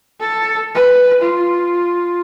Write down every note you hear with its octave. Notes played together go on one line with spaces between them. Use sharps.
A4
B4
F4